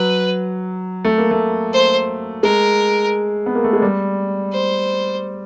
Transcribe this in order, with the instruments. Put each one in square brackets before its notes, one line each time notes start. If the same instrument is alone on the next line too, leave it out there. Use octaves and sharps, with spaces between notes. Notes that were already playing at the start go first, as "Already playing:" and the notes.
Already playing: [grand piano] F#3 [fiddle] B4
[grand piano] A3
A#3
A3
[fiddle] C5
[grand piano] G#3 [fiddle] A#4
[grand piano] B3
A#3
A3
G#3
G3
[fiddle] C5